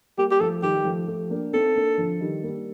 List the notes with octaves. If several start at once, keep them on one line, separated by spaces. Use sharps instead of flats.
G3 A#3 G4
G4
F3 A3 A4
D#3 G3 G4
G3
F3 A3
F3 A3
A#3 D4
C4 D#4 A4
A#3 D4
D3 F3
D#3 G3
G3 A#3